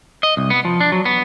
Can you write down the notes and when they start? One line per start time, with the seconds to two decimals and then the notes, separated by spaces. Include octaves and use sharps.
0.23 D#5
0.37 C2
0.50 B3
0.65 F3
0.80 D4
0.92 F#3
1.05 B3